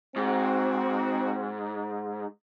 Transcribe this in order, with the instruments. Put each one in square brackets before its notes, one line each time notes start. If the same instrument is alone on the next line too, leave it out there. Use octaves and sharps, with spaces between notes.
[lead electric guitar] G#2 [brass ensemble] C4 F#4